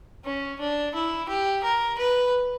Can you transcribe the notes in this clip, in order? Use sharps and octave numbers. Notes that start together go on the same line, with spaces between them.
C#4
D4
E4
G4
A#4
B4